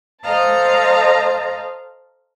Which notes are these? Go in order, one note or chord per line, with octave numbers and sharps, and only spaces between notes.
A4 C5 D#5 F5 A5 A#5